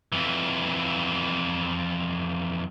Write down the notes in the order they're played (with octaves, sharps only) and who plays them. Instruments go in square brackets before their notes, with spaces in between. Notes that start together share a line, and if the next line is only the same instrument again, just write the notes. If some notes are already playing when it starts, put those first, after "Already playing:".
[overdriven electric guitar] F2 E3